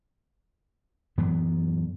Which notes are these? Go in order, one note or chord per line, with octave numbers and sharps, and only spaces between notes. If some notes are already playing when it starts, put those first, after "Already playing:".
F#2 E3 F#3 B3